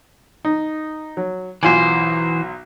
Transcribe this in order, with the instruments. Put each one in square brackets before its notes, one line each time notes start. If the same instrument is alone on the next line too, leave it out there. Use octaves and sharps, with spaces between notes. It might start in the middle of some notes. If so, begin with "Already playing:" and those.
[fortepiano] D#4
F#3
[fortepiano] B1 F4 G#5 [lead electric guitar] E3 C5